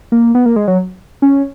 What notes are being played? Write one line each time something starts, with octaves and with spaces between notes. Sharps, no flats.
A#3
B3
A#3
G#3
F#3
C#4